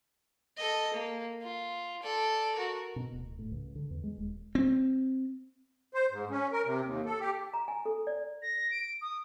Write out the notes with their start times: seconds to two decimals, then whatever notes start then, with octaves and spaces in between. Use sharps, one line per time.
0.57 A4 D#5
0.94 A#3
1.42 F4
2.03 A4 D5
2.56 F#4 A#4
2.96 B2
3.13 D1
3.39 A2
3.51 C#2
3.75 D3
3.90 E2
4.03 G#3
4.18 D#1
4.55 C4
5.94 C5
6.11 G#2
6.31 C#4
6.52 A#4
6.66 C3
6.84 D#2
7.06 A4
7.20 G4
7.53 A#5
7.68 G#5
7.85 A4
8.07 D5
8.42 A#6
8.71 D7
9.02 D#6